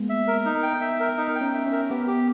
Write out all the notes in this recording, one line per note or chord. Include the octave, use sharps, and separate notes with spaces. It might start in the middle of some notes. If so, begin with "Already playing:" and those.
Already playing: G#3 A#3 B3
E5
A#4
D#4
G5
E5
A#4
D#4
G5
C#4
E5
C#4
A#4
B3 G4
G4